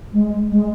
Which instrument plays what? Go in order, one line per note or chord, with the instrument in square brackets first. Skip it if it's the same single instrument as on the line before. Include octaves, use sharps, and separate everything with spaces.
[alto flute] G#3
G#3